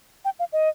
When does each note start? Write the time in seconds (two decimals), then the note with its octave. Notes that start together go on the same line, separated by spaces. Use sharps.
0.25 G5
0.39 F5
0.53 D#5